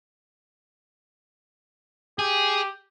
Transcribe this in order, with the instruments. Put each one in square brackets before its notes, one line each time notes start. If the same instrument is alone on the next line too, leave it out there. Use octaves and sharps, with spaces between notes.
[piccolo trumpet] G4 [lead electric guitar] G#4